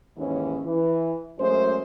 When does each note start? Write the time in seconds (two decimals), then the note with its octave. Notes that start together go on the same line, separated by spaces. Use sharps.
0.17 D#2 G#2 E3 C#4
0.64 E3
1.39 F#2 G#3 A3 C#4 C5